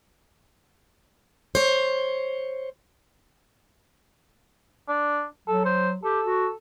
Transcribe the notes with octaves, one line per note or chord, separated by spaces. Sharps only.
C5 C#5
D4
F#3 A4
C5
G4 A4
F#4